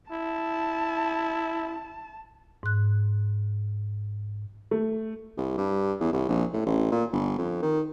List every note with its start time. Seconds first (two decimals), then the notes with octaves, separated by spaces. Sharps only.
0.11 E4 A5
2.63 G#2 F#6
4.71 A3
5.38 C2
5.58 G2
6.00 E2
6.13 C2
6.29 A#1
6.53 A2
6.66 A1
6.92 A#2
7.12 G1
7.38 F2
7.62 D#3